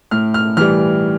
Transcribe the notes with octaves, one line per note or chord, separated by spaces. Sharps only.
A2 F6
F6
E3 G3 F6